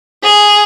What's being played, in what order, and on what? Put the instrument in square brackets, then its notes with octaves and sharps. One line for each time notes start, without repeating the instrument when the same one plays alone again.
[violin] G#4